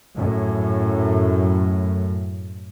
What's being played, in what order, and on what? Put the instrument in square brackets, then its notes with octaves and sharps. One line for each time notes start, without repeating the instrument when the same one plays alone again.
[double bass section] F#2 A2